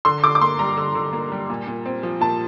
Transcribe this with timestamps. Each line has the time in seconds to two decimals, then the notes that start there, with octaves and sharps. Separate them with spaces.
0.05 D3 C6
0.24 D3 D6
0.35 D6
0.41 A#3 C6
0.59 G3 A#5
0.77 D3
0.95 D3
1.13 A#3
1.32 G3
1.50 A#2
1.68 A#2
1.86 C4
2.03 F3
2.21 A#2 A5